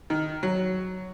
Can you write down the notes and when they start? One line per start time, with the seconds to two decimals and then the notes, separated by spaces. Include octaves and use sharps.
0.10 D#3
0.43 F#3